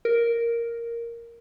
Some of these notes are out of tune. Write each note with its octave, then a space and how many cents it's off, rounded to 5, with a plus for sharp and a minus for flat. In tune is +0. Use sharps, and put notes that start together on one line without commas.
A#4 +0